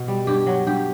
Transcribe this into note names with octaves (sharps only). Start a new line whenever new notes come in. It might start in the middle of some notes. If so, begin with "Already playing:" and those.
Already playing: B2
G3
G2 G4
F#3
G2 G4